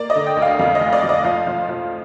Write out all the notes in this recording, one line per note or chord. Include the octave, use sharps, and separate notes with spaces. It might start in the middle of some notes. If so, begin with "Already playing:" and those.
Already playing: A#3 D5
D#5
D3
G5
D2
F5
F2 F5
D#5
F1
D5
F2
D#5
F3 F5
F3
F3